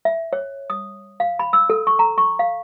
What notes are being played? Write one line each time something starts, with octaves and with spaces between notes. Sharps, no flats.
E5
C#5
D#6
F5
B5
E6
A4
C#6
A#5
C#6
F5